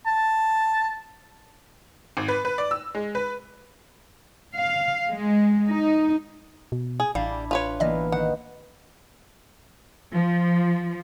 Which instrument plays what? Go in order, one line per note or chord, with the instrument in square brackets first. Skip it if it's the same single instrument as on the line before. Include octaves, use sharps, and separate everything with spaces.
[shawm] A5
[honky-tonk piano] G#1
B4
B4
D5
E6
G#3
B4
[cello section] F5
G#3
D#4
[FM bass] B2
[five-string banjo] G#4
[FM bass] A1 [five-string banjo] G3 [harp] D4 E4 [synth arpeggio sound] F5
[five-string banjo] F4 B4 C#5
[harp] E3 A#3 B3 [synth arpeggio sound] D5 D#5
[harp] D#3 [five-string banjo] F#5
[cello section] F3